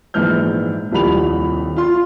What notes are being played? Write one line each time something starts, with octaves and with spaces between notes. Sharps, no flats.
A#1 G#2 E3 F6 G6
D#1 C2 F3 B5 F7
F4 C6